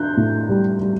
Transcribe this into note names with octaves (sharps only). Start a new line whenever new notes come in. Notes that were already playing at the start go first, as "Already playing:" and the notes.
Already playing: D4 F#6 G6
A2
G3
G3